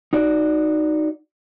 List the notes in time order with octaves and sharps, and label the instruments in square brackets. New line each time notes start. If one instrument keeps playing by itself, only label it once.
[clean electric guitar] D#4 F#4 D5